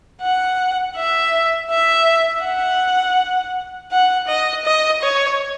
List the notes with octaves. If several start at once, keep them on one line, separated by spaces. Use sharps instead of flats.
F#5
E5
E5
F#5
F#5
D#5
D#5
C#5